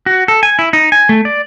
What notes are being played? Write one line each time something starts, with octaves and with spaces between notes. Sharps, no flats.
F#4
A4
G#5
E4
D#4
G#5
A3
D5